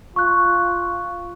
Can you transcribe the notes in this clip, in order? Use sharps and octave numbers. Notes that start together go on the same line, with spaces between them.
F4 C#6 F#6